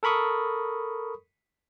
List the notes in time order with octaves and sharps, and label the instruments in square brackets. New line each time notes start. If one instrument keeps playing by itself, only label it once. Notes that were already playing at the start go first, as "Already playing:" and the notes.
[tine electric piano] A4 A#4 B5 C#6 D#6